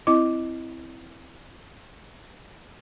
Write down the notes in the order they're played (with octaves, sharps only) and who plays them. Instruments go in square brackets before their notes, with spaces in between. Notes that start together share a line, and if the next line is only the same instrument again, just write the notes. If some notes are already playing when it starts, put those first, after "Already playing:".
[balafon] C4 E4 D#5 D6